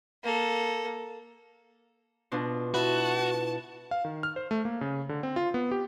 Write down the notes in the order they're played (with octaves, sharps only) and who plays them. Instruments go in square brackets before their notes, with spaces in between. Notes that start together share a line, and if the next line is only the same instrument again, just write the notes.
[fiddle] A#3 A4
[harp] B2 D4 F4
[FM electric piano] E4 B4 [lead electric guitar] F#4 [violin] A5
[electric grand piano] F5
D#3
F6
C5
A3
A#3
C#3
D3
C4
F4
B3
G4